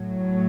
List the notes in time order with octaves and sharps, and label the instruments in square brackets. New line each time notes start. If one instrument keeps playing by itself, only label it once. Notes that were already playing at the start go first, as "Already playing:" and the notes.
Already playing: [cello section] A2 F#3